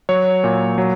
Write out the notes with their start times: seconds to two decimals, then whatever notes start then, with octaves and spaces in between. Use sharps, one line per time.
0.09 F#3 C#5
0.44 A#2
0.78 F#3